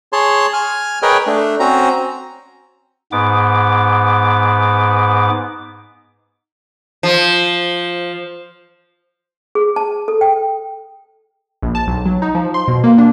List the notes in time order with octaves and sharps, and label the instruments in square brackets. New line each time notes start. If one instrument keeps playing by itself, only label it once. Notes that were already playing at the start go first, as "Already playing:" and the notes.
[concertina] G#4 C#5 A5 C6
G#5 F6
G#4 A#4 B4 C#5 D#5 G5
A3 D4
C4 C#4 F#4 A#5
[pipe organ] G#2 B3 D6
[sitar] F3
[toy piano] G#4
A5
A4
G5
[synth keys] A#1
A5
B1
F#3
D#4
F3
C6
B2
A#3
D4